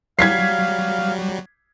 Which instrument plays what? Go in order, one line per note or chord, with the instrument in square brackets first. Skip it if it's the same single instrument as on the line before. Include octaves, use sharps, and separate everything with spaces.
[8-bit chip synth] F#3 G3 [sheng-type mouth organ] F5 [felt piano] G#6 B6 C7